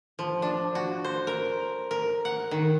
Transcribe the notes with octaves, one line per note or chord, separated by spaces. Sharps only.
F3
D4
F#4
C5
A#4
A#4
F#5
D#3